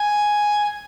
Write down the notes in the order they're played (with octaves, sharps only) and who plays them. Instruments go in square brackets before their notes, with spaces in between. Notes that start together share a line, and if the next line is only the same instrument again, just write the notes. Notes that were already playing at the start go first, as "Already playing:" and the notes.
Already playing: [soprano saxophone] G#5